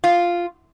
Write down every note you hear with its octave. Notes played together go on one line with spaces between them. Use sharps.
F4